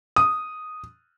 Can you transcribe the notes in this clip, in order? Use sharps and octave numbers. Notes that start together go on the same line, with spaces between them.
D#6